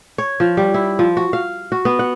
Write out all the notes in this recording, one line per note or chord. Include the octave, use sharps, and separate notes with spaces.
C#5
F3
G3
E4
F3
F#4
F5
F#4
B3
F#5